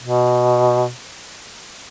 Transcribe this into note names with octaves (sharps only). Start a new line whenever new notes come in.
B2